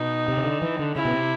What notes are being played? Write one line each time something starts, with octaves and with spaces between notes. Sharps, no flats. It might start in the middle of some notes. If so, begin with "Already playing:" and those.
Already playing: B2 D#4
C3
C#3
D3
E3
D3
C#3 E4
B2
C3